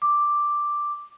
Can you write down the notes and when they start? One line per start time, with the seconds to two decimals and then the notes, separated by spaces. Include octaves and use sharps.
0.02 D6